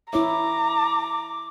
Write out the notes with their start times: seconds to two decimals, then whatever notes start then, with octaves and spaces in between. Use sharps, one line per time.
0.13 E4 C#5 E5 A#5 D6